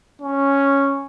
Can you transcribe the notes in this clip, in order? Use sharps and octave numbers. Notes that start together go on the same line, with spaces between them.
C#4